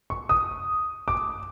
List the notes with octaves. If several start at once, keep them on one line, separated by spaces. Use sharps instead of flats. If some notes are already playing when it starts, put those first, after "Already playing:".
C#6
D#6
D6